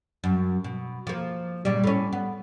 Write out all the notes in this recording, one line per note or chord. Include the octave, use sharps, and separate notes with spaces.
F#2
B2
F3 A#3
A#2 C#3 G3
A2 C#4
B3